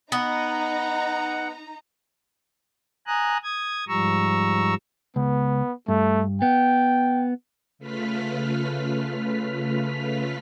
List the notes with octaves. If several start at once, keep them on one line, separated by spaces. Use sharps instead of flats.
B3 D#4 F#5 A#5
G#5 A#5 D#6 F#6
D#6 G#6
G#2 F3 G3 A#5 C#6 E6
C#2 B3
G2 A3
B3 G5
C#3 A3 F4 B4 F6 B6